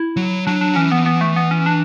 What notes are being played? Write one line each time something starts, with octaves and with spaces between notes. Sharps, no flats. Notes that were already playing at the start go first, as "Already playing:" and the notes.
Already playing: E4
F#3
F#3 D4
D4
E3 C#4
B3
B3
A3
B3
C#4
D4